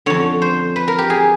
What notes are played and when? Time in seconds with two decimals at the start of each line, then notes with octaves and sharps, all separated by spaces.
0.06 F2 D3 C#5
0.42 C5
0.76 B4
0.88 A#4
0.98 G4
1.10 G#4